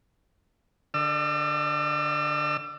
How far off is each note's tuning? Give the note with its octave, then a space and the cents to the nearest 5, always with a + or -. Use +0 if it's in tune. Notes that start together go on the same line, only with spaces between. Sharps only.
D3 +0 D5 +45 E6 +40